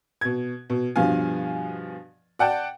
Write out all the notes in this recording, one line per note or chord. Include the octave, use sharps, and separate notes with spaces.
B2 G#6
B2
G2 B2 F3 F5 G#5
D5 F#5 G5 A5